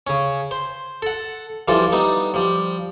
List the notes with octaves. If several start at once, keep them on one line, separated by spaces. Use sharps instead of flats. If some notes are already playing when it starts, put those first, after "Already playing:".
C#3 C#4
C5
A4 F#5
E3 F3 G3 F4 A4
G3 B3 D#4
F3 G3